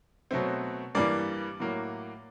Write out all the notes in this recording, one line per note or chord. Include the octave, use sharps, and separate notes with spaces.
B2 F#3 A3 C4
G2 E3 G3 A#3 D5
A2 F#3 A#3